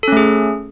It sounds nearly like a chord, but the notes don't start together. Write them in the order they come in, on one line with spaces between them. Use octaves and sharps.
A4 C#4 A3 G#4